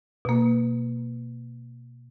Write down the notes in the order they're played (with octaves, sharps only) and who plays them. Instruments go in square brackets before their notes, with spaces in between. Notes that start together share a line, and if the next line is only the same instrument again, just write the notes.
[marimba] B2 A#3